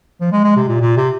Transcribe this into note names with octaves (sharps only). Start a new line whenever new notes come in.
F3
G#3
G#3
C3
A#2
A#2
C3